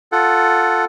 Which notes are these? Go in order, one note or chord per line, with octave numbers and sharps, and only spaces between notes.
F4 A4 F#5